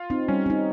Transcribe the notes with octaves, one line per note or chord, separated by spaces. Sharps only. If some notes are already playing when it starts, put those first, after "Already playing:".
Already playing: F4
C4 D#4
G3 C#4
C4 D#4